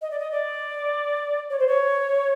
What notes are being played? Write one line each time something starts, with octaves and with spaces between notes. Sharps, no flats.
D#5
D5
D#5
D5
C#5
C5
C#5